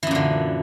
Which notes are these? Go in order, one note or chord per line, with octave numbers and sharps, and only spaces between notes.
F#2 A#2 D3 E3